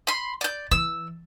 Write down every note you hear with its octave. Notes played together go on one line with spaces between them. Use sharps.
B5 C6
D5 G6
E3 E6